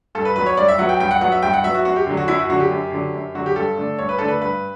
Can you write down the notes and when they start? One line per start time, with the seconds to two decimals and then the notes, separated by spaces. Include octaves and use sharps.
0.15 G2 A4
0.25 B4
0.36 F#3 B3 B4
0.46 C#5
0.57 G2 D5
0.68 E5
0.78 F#3 B3 F#5
0.89 G5
1.00 G2 G5
1.11 F#5
1.21 F#3 B3 F#5
1.32 E5
1.43 G2 G5
1.53 F#5
1.64 F#3 B3 E5
1.75 F#4
1.85 F#2 F#4
1.96 G4
2.07 D3 F#3
2.17 F#4
2.28 F#2 E4
2.39 F#4
2.49 D3 F#3 F#4
2.60 G4
2.71 F#2
2.92 D3 F#3
3.14 F#2
3.35 D3 F#3 F#4
3.46 G4
3.56 G2 A4
3.78 D3 A3 D4
3.99 G2 C#5
4.09 B4
4.18 D3 A3 D4 A4
4.28 B4
4.42 G2 B4